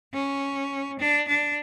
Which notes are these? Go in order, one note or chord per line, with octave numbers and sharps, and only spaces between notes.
C#4
D4
D4